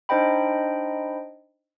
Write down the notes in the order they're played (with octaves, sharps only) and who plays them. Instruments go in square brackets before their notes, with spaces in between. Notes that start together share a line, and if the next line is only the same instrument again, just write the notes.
[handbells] D4 D#4 C5 D#5 G5 B5